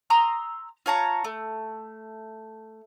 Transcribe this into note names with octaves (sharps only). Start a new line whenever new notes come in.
A#5 C6 D#6 E6
F4 C#5 A5 A#5
A3